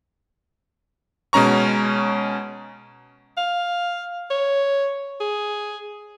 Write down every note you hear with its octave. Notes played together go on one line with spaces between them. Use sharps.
B2 G#3 C#4 A#5 C#6
F5
C#5
G#4